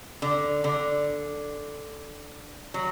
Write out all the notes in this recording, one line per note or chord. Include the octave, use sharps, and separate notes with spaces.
D3
D3
F#3